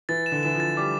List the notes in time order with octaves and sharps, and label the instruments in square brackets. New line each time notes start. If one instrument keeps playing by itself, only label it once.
[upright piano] E3 [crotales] A6
[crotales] E7
[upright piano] D3
[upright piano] E3 [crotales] E7
[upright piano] F3
[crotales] A6
[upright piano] G3 [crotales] D6